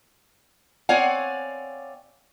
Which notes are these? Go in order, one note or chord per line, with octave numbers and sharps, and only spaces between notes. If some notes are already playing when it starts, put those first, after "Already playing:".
C4 C#5 D5 F5 F#5 G#5